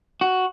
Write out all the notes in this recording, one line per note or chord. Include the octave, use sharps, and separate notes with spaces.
F#4